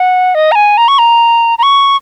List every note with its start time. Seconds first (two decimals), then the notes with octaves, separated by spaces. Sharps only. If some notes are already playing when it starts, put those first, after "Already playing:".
Already playing: F#5
0.35 D#5
0.52 A#5
0.55 G#5
0.77 A#5
0.88 C#6
0.98 A#5
1.58 A#5
1.63 C#6